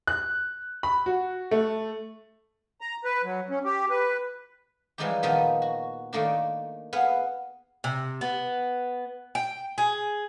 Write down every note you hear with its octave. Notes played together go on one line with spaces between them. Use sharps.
F#6
B5
F#4
A3
A#5
B4
F#3
C#4
G4
B4
E3 F3 G3 G#3 D#4 G4
A#2 D#3 F3 B3 D#4
F#4
D#3 A3 A#3 D4
B3 G#4 F5 F#5
C3
B3
G5
G#4